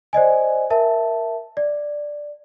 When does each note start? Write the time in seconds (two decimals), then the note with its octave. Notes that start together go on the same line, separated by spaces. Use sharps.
0.13 C5 D5 D#5 G#5
0.70 A#4 E5 A5
1.57 D5